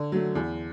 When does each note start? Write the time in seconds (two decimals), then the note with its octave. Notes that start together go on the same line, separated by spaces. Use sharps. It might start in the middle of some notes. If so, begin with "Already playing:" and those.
Already playing: D3
0.12 F#3 A3
0.35 E2